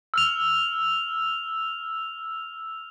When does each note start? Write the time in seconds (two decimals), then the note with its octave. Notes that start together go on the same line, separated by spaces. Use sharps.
0.14 E6 F6 F7